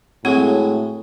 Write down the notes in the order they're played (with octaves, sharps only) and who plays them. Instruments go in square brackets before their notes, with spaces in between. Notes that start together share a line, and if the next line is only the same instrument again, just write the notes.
[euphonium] A2 [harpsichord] F#3 G#3 [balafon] C4